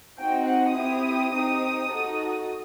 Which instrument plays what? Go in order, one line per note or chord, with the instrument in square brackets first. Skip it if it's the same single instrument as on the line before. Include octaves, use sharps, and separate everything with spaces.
[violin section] C4 D#4 F#4 G5
F#5
C4 E4 G4 D#6
C4 D#4 G4
D#4 F#4 A4